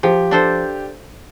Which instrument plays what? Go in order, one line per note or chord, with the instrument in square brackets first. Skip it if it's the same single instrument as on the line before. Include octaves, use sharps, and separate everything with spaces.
[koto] F3 [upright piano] G4
[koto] D4 A4 C5